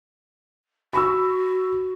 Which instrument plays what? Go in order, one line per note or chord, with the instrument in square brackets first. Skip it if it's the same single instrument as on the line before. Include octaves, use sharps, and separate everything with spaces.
[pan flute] F#4 [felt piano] B5 C#6 E6